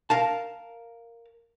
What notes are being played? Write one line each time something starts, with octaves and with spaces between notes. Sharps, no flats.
A#4 F5 A5